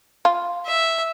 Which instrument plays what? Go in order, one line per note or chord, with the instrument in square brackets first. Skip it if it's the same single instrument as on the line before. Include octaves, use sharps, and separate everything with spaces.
[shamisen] F4
[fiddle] E5